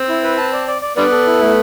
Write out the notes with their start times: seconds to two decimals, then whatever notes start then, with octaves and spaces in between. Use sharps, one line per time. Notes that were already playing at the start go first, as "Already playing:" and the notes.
Already playing: C4
0.09 E4
0.23 B4
0.37 A5
0.53 D5
0.67 D5
0.82 D5
0.96 D3 G3 B3 D5
1.11 A4
1.27 E4
1.41 A3